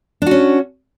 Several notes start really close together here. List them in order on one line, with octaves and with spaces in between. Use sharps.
D4 F#4 C#4